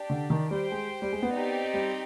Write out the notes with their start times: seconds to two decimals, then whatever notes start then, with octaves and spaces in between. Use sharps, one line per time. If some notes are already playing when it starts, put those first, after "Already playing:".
Already playing: D4 G4 D5
0.10 D3
0.30 D#3
0.51 G3 G4 C5 G5
0.72 G#3
1.02 G3
1.12 G#3
1.22 B3
1.32 C4 D#4 G4 D5
1.74 G3